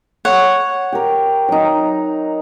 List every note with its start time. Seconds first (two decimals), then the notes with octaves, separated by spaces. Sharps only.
0.25 C#5 F#5
0.93 G4 A#4
1.49 F#3 D#4